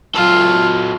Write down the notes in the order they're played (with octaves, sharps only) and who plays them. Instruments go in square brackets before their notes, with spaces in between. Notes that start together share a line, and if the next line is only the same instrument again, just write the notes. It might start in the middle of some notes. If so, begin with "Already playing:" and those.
[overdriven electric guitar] F#3 A4 [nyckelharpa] F4